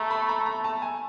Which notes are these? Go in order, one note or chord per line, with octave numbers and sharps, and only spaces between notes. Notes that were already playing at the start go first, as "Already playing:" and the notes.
Already playing: A3 A5 A#5
B5
A#5
A#5
A5
G#5